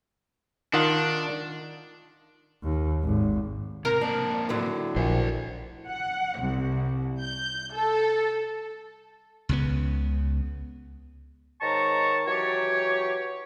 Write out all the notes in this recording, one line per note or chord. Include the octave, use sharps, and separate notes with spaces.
D#3 D4 F4 F#5
D#2
G#1
C3 A#4
A#3 C4 D4
A2 D3 F#3
A#1 C5 D5
F#5
C2
G6
A4
C#2 C#3 B3
G#2 D#3 C#5 A5 A#5 C#6
E3 F#3 G4 C#5